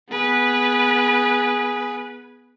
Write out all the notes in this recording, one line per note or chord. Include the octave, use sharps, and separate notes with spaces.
B3 G#4 B4